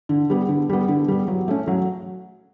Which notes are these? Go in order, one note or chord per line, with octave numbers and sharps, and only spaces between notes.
D3
G3 B3
D3
G3 B3
D3
G3 B3
F#3
A3 C#4
F#3